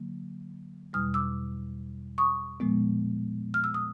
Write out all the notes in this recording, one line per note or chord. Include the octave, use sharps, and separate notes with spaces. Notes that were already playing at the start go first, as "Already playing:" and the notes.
Already playing: D3 F#3 A#3
E2 B2 G3 D#6 F6
D6 E6
C#6 D#6
A#2 F3 G#3 B3
F6
E6
D#6